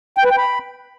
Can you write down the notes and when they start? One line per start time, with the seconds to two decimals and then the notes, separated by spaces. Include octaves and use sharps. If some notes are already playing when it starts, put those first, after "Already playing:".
0.17 G5
0.24 B4
0.31 G5
0.38 B5